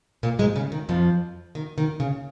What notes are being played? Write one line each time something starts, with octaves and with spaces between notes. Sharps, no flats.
A#2 A#3
G#2 G#3
C#3
D#3
F2 F3
D#3
D#3
C#3